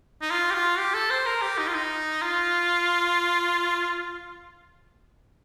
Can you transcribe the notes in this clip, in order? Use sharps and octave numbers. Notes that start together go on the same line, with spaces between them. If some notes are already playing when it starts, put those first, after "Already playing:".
D#4
F4
G4
F4
G4
A4
C5
A#4
G4
D#4
F4
D#4
F4